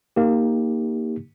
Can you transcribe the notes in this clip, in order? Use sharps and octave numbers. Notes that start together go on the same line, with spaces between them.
A#3 D#4 G4